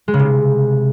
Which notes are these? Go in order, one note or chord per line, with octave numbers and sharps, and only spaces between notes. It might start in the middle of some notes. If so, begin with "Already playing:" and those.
G#3
C#3
C3